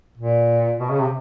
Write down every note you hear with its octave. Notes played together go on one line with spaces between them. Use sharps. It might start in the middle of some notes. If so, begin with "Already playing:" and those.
A#2
B2
C#3
C3